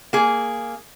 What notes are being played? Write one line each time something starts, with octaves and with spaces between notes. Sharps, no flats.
A#3 G#4